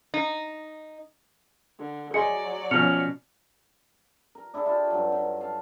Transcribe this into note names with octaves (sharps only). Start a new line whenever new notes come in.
D#4
D3
F#3 G#4 D5 D#5 C6 C#7
B2 F3 C#4 F6 C#7 F7
A#4
D4 E4 G#4 A4
E4 F4 G4 A5
G2 F#3
D#3
F5 A5